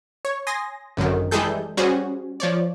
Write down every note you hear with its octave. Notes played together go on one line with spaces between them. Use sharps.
C#5
G#5 C6 D#6 A#6
G#1 F#2 D3 D#3
E3 G3 G#3 G#4 A4 G6
G3 C#4 F#4 G#4 C5
F3 C#5 D5